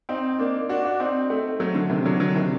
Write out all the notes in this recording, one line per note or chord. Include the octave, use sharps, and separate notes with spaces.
C4 D#4
A#3 D4
D4 F#4
D4 F#4
C4 D#4
A3 C4
F#3 A3
D3 F#3
C3 D#3
D3 F#3
D3 F#3
C3 D#3